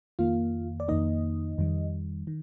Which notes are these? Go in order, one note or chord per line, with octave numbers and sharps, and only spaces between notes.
F2 D#3 A#3 F4 F5
D5
F2 D#3 A#3 D#4 D#5
F2 D#3 G3
D#3